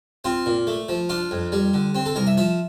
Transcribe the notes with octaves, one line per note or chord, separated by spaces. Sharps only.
C4 F4
A#2
A3
F3
D4 F4
F2
G3
D3
C4
A4
C2 A#4
E5
F3 E5